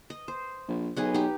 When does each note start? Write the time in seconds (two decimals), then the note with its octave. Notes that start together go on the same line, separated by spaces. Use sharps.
0.10 D#5
0.28 C5
0.68 A#1
0.96 B1 G#4 B4 D#5
1.14 D#4 G4